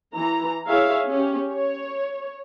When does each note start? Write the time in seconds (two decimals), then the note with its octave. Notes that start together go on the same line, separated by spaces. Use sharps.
0.15 E3 A#5
0.68 E4 G#4 C#5 E5 F5
1.07 C#4 G4
1.51 C#5